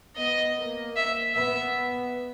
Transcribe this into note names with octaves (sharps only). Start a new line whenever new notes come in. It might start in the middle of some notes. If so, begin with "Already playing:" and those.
B3 D#5
A#3
E5
B3 E5